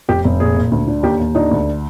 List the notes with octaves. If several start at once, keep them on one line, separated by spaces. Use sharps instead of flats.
F1 G4
F1
A#2 G#4
A#2
D2
D3
D#2 G4
D#2
D3 D#4
D2